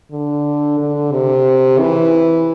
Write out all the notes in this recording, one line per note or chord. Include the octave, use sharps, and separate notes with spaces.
D3
D3
C3
E3